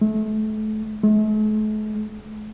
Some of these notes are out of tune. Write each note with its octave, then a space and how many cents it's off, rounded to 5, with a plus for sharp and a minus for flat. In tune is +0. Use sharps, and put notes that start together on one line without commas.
A3 -30
A3 -45